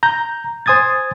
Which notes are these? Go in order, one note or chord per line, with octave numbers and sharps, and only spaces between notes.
A#5 G6
C5 G#5 D#6 G#6 A6